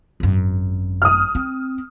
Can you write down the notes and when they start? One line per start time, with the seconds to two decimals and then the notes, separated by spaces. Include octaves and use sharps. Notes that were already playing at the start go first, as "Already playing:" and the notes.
0.20 G#1 F#2
1.02 D#6 F6
1.35 C4